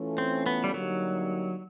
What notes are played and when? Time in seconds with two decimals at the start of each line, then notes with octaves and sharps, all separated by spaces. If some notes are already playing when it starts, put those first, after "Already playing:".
Already playing: E3 A3 C#4 F4 A4
0.18 C4
0.46 B3
0.64 G3
0.74 D3 F#3 G3 A#3 D#4 G4